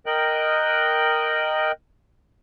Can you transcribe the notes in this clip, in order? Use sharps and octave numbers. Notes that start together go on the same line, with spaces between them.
A#4 D#5 G5 F#6